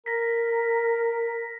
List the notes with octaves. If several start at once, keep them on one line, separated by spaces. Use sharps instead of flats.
A#4 A#6 B6